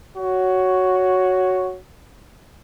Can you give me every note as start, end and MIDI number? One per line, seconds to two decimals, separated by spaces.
0.17 1.78 66
0.17 1.78 73